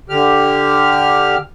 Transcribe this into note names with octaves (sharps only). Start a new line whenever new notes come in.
D3 G4 F6